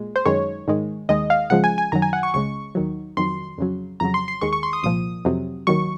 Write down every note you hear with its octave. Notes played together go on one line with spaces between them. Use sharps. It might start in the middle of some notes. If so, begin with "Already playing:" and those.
Already playing: A#2 G#3
C5
F#2 D#3 G#3 C#5
G#2 D#3 G#3
D#2 D#3 G#3 D#5
F5
C#2 C#3 F3 G#3 F#5
G#5
G#5
F#2 D#3 F#3 A#5
G#5
F#5
C#6
C#2 C#3 G#3 C#6
D#2 D#3 F#3
F2 D#3 F#3 C6
F2 C#3 F#3
F2 C#3 F#3 A#5
C6
C6
D#2 D#3 G#3 C#6
C#6
C6
D#6
C2 A#2 F3 D#6
F2 C3 F#3
D#2 D#3 F#3 C#6